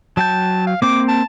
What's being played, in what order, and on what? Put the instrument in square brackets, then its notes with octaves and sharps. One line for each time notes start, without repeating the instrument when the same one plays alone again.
[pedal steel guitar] F#3 G5 G6 [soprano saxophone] A5
[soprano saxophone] F5
[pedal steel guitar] A#3 C4 G5 [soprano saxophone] D6
[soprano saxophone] A5